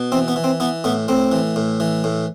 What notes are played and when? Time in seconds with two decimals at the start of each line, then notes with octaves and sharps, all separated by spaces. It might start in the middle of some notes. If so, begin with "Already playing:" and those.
Already playing: B2
0.12 E3 C4
0.28 B3
0.36 E3
0.44 C4
0.60 E3 B3
0.84 A2 B3
1.08 A2 C4
1.32 E3
1.56 A2
1.80 E3
2.04 A2